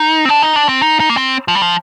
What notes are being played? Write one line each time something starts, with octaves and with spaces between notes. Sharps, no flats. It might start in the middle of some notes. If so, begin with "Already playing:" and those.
Already playing: D#4
C4
D4
D#4
D4
C4
D#4
D#4
A#3
C4
F3
G3
F3